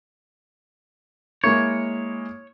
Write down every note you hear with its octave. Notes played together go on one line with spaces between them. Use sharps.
G#3 A#3 E4 C#5